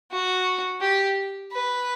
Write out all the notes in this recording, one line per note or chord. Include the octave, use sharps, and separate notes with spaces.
F#4
G4
B4